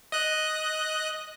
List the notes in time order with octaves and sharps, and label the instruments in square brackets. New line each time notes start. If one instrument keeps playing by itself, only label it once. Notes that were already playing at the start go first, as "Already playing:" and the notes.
[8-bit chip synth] D#5 F#6